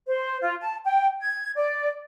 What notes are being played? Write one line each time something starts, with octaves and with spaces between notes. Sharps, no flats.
C5
F4
A5
G5
G#6
D5